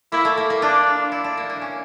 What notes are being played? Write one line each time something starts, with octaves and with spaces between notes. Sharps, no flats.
A#3 E4
A3
A#3
A#3
D4 F4
E4
D4
A#3
A#3
C#4